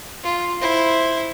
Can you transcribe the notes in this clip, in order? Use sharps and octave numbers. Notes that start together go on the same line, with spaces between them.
F4
E4 C5